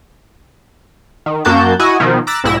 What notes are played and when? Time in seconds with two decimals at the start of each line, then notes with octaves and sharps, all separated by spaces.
1.26 D#3
1.45 F#2 A#3 F#4 A5 G6
1.79 E4 F#4 D#5 G#5
2.00 B2 D#3 F3
2.27 A#5 D6 E6 F#6 A6 B6
2.44 B1 G#2 E4 A#6 E7